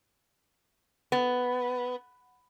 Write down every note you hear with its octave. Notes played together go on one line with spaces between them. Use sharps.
B3